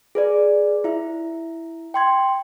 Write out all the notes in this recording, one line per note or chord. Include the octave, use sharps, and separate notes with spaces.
G#4 B4 D5
E4 E5
G5 C6 G#6